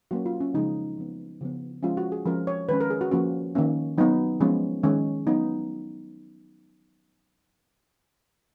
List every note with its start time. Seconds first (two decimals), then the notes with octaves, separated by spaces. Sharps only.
0.11 F#3 A#3 C#4 F#4
0.26 F4
0.40 C#4
0.54 C#3 F3 G#3 C#4 D#4
0.98 F3 B3
1.41 C#3 F3 B3
1.83 F3 G#3 C#4 F4
1.97 F#4
2.12 G#4
2.26 F3 G#3 C#4 A#4
2.47 C#5
2.69 D#3 G#3 C#4 B4
2.80 A#4
2.90 G#4
3.01 F#4
3.11 F3 A#3 C#4 F#4
3.55 D#3 A#3 C#4
3.98 F#3 B3 D#4
4.40 F3 G#3 B3 C#4
4.83 D#3 G#3 C#4
5.27 F#3 B3 D#4